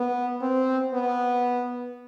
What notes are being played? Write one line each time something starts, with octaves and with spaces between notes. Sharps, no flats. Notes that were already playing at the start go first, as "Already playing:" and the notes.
Already playing: B3
C4
B3